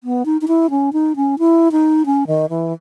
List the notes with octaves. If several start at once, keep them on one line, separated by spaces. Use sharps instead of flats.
B3
D#4
D#4
E4
C#4
D#4
C#4
E4
D#4
C#4
D#3
E3